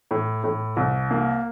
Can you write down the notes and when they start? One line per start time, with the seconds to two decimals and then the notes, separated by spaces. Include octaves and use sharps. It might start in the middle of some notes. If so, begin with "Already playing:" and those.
0.11 A2
0.44 A2
0.77 C2
1.11 A#3